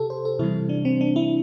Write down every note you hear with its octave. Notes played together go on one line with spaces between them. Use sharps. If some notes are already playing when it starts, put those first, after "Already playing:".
Already playing: C3 G4 A4
C5
A4
C3 E3 G3 E4
D4
C4
D4
E4